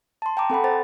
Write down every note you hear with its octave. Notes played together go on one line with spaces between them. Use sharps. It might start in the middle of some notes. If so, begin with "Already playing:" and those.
A5 C6
G5 A5 A#5 D6
C4 A4 F#5 B5
A4 C5 A6